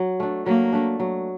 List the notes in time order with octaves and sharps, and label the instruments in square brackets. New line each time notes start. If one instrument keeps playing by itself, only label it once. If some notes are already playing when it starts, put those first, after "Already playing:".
Already playing: [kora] F#3
A3 D4
[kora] F#3 [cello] A#3
[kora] A3 D4
F#3